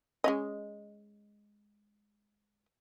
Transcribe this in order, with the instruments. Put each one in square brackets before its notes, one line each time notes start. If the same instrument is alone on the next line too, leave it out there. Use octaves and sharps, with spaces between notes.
[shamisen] G#3 C#4 D#5